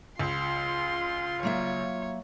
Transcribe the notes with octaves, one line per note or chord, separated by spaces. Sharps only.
C#2 F4 C6
F#3 A#3 C#5 E5